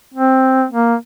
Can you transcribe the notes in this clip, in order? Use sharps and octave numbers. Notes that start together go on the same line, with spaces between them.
C4
A#3